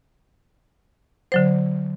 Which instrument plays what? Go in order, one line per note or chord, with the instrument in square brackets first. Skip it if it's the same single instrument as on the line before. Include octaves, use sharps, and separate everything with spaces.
[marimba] D3 F#3 C5